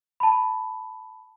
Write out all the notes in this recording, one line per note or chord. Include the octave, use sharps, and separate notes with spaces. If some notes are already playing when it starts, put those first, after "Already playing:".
A5 B5